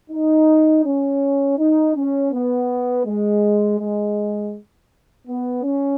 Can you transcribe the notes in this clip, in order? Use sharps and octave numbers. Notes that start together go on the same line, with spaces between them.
D#4
C#4
D#4
C#4
B3
G#3
G#3
B3
C#4